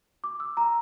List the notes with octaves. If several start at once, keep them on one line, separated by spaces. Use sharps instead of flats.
D6
E6
A#5